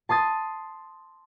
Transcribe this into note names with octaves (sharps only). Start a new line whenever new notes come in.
A5 C6 D#6 A6